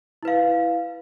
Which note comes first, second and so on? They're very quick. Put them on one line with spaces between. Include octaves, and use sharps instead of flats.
E4 B4 F5